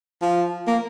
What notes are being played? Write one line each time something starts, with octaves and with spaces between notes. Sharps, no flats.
F3
A#3